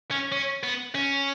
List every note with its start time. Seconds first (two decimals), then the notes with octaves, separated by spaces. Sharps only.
0.11 C#4
0.32 C#4
0.64 B3
0.95 C#4